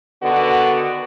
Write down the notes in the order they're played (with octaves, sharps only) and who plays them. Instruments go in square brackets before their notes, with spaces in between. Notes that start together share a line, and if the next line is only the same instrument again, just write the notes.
[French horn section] D3 D#3 B3 F#4